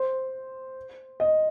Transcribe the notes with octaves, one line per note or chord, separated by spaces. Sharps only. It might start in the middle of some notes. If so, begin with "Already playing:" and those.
Already playing: C5
D#5